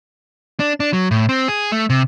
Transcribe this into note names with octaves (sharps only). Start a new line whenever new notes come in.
D4
D4
F#3
A2
C4
G#4
A3
C3